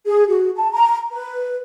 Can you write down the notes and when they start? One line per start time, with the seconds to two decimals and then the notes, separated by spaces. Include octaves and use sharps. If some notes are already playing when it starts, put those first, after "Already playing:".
0.06 G#4
0.29 F#4
0.56 A5
0.72 A#5
1.11 B4